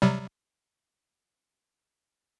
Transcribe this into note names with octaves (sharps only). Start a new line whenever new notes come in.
C3 F#3 G3